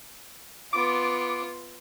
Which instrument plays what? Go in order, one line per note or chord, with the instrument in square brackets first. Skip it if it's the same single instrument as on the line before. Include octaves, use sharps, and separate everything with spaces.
[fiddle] B3 F4 [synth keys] D6